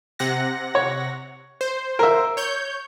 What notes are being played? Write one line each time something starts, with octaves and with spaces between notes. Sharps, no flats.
C3 F#5 A#6
C#5
C5
A#4 E5
C#5 G6